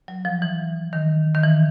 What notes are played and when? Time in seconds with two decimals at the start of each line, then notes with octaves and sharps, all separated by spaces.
0.08 F#3
0.25 F3
0.42 E3
0.93 D#3
1.35 D#3
1.43 E3